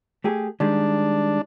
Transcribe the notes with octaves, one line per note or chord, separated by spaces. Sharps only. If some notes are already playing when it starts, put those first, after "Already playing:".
A3 G4 G#4
D#3 G3 G#3 D4